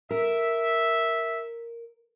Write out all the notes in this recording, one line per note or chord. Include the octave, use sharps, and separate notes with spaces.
A#4 E5